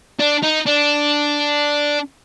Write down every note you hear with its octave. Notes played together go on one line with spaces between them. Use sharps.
D4
D#4
D4